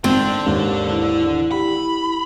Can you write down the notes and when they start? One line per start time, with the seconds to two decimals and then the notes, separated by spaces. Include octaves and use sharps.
0.04 G#1 D3 C4 D4
0.46 D#2 G#2
0.90 E4
1.52 G4 B5